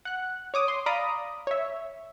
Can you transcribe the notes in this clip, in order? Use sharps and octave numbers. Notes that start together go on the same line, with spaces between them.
F#5 F#6
C#5 D6 D#6
C6
D5 F5 A#5 B5 D6 D#6
C#5 E5